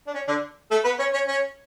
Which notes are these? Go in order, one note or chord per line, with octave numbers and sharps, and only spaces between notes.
D4
C#4
D3 D4
A3 A4
B3 B4
C#4 C#5
C#4 C#5
C#4 C#5